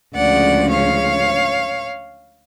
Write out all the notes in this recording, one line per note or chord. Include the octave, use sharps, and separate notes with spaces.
D2 C#3 F3 G#3 C#4 D5 F#5
C#5 F5